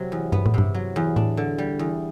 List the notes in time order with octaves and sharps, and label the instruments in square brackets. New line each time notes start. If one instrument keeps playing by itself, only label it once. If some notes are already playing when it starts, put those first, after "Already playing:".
Already playing: [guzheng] C3 F#3 C4
E2
[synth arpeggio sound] G2 [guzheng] B3
[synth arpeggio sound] A2
[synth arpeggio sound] G2 [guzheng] C3
[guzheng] F#3
E2
[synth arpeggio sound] A2 [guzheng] D4
[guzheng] D3
G3
E2